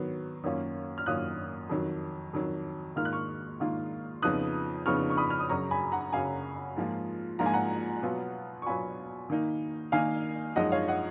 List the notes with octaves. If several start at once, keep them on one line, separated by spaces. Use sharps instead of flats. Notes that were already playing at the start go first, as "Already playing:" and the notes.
Already playing: D#3 F#3 B3
F#2 D#3 A#3 C#4 F4
F6
F#2 D#3 A#3 C#4 F4 D#6 F#6
F2 D#3 F#3
F2 D#3 F#3
G#2 D#3 A#3 F4 F6
F#6
C#6 F6
G#2 D#3 A#3 F4
F2 C#3 F3 B3 D#4 D#6 F#6
F2 C#3 F3 B3 D#4 C#6 F6
C#6
B5 D#6
F6
D#6
F#2 C#3 F#3 A#5 C#6
G#5 B5
F#5 A#5
F#2 C#3 F#3 F5 G#5
G#2 F3 A#3 F4
G#2 F3 A#3 F4 A#5
G#5
F#5 A#5
B2 F#3 B3 F4
C#6
B2 F#3 B3 F4 G#5 B5
D#3 A#3 D#4
D#3 A#3 D#4 F5 G#5
F#2 F3 G#3 D#4 D#5 F#5
C#5 F5
D#5 F#5